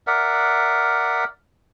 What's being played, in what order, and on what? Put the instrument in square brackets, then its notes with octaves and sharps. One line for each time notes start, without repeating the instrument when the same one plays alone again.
[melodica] A#4 D5 E5 F#5